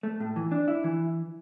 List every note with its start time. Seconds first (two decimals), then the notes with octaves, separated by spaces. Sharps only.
0.03 A3
0.20 A2
0.36 E3
0.52 D4
0.68 E4
0.84 E3